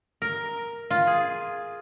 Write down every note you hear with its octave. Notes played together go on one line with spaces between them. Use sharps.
A#4
F4
G#4